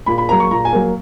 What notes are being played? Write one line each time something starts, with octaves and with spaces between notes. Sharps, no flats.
A#2 B5
B5
F#3 A#3 A#5
C#6
A#2 A#5
G#5
F#3 A#3